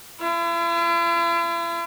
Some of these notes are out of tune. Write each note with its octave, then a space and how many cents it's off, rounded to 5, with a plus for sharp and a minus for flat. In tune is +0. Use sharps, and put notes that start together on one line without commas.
E4 +45